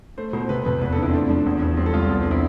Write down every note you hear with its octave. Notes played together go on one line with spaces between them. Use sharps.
A3 C5
B2 C5
C3 B4
F2 B4
E2 B4
A4
D3 E4
C4
A3 D4
F3
E2
E2
G3 C4
A4
C2 F4
E2
C4
D3 E4